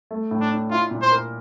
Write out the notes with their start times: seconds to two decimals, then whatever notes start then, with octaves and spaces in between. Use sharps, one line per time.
0.11 A3
0.31 A2
0.41 D4
0.51 D4
0.71 E4 F4
0.91 A#2
1.02 C5
1.11 A#4